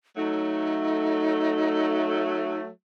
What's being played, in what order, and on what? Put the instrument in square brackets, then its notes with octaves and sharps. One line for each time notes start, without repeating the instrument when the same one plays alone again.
[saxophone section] F#3 A3 [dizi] D#4